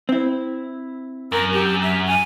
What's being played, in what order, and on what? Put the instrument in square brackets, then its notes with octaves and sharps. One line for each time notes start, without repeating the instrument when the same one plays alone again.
[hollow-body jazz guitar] C4 E4
[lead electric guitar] F#2 [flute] A#4
[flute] G4
E5
G#5